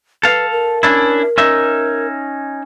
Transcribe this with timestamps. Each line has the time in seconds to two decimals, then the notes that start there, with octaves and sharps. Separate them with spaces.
0.23 A4 B4 F5
0.51 A#4
0.83 C#4 D4 E4
1.38 C#4 D#4 E5